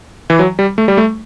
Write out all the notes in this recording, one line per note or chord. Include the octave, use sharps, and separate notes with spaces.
E3
F#3
G3
A3
G3
A3